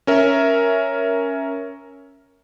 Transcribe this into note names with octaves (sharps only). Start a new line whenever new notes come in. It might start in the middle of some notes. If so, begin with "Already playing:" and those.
C#4 A#4 E5